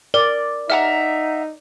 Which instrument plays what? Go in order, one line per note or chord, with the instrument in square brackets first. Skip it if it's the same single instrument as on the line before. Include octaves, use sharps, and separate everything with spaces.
[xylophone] A#4 [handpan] D5
[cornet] D#4 [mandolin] E5 F#5 A#5 [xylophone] F6